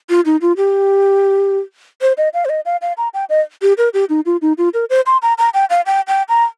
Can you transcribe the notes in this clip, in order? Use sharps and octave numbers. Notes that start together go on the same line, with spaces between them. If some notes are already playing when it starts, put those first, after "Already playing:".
F4
D#4
F4
G4
C5
D#5
F5
C5
D#5
F5
F5
A#5
G5
D#5
G4
A#4
G4
D#4
F4
D#4
F4
A#4
C5
C6
A#5
A#5
G5
F5
G5
G5
A#5